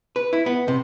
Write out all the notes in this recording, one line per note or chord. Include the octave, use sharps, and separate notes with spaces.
B4
E4
B3
C3